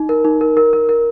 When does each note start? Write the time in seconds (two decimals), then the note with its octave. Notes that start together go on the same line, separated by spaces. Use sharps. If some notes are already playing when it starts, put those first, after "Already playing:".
Already playing: D#4
0.09 A#4
0.25 D#4
0.41 A#4
0.57 A#4
0.73 A#4
0.89 A#4